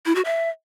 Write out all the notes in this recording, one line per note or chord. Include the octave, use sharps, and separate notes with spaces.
E4
F#4
E5